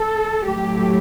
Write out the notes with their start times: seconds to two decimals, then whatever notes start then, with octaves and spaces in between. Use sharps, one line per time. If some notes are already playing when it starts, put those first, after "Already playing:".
Already playing: A4
0.45 A2 F#3 A3 G4